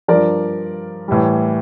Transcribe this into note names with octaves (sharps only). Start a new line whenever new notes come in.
G2 F3 A#4 D5
A2 E3 G3